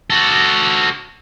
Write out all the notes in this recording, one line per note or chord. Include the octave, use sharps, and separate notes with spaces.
F#4 A4